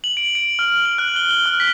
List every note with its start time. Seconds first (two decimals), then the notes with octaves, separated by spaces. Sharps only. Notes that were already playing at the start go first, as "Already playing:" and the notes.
0.04 F#7
0.17 D7
0.35 D7
0.59 F6
0.85 F#7
0.98 F#6
1.16 G7
1.31 G7
1.46 F6
1.60 B6